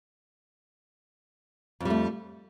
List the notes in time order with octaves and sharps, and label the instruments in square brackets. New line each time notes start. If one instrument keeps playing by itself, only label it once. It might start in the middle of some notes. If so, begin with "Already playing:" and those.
[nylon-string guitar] F2
G3
A3